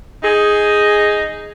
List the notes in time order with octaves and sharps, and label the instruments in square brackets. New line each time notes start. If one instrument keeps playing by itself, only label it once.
[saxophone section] D#4 G#4